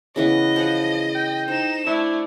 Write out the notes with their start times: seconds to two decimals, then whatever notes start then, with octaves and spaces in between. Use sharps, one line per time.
0.16 C#3 E3 B3 D#5
0.56 F3 G#4 F#5 B5
1.15 G5
1.48 D#4 C5 E7
1.87 A3 D4 E4